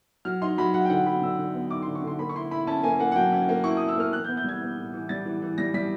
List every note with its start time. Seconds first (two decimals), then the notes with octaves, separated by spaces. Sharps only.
0.25 F#3 F6
0.42 D#4 C6
0.58 F#3 B5
0.74 F#3 F#5
0.85 G5
0.90 D3 F#5
1.06 F#3 B5
1.22 D3 E6
1.38 D3
1.54 B3
1.71 D#4 D6
1.82 D3 C6
1.95 C#6
2.02 D3 C6
2.19 A#3 B5
2.29 C#6
2.35 E4 C6
2.51 E4 B5
2.67 C#4 A5
2.83 A#3 G#5
2.99 A#3 F#5
3.12 F#5
3.16 F#3 G5
3.32 C#4
3.49 A#3
3.64 E4 C#6
3.77 E4 D#6
3.89 E6
3.96 A#3 F6
4.13 E3 F#6
4.24 B3 G6
4.37 G6
4.44 G3 G#6
4.62 B3
4.77 A2
4.94 E3
5.09 G3 A6
5.26 E3
5.42 E3
5.58 G3 A#6
5.74 G3 B6